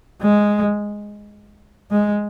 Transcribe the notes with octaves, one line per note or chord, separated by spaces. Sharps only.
G#3
G#3